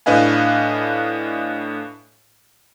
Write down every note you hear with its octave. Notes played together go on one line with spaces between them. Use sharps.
A2 D4 B4 D#5 F5 G#5